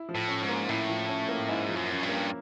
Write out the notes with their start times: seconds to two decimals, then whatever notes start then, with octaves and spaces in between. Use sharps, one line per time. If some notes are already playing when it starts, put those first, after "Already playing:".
Already playing: E4
0.09 F3
0.15 A2
0.28 C#4
0.42 G#2
0.49 A#3
0.69 A2 E4
0.89 F3
1.09 C#4
1.29 A#3
1.49 G#2 E4
1.69 F3
1.76 F#2
1.89 C#4
2.03 G2
2.09 A#3